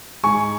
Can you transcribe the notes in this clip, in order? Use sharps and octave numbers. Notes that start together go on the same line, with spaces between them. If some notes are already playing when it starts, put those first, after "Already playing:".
G#2 G#5 C#6